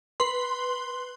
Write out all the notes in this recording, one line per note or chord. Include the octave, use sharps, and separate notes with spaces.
B4 C6